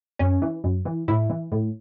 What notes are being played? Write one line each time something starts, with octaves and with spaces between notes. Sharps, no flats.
F#2 C#4
E3
F#2
E3
A2 E4
E3
A2